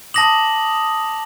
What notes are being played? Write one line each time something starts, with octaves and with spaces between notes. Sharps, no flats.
A5 D6 D#6 A#6 F#7